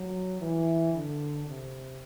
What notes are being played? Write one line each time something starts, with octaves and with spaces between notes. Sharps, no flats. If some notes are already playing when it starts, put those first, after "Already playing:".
Already playing: F#3
E3
D3
C3